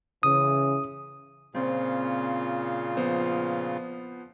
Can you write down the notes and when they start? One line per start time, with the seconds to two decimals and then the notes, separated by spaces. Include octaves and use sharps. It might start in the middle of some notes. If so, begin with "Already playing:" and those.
0.23 C#3 E3 C#4 D#6
1.55 A#2 C#3 C4 F4
2.97 F3 B3 C5